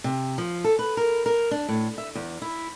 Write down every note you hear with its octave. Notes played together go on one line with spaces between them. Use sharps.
C3
F3
A4
B4
A#4
A#4
D4
A2
E5
E2
E4